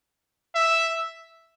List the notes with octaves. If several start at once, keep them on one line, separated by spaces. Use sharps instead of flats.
E5